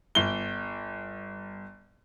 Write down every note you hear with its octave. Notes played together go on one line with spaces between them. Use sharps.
G1 G7